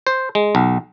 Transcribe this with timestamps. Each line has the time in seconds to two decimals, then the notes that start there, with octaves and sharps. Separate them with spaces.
0.07 C5
0.35 G#3
0.55 B1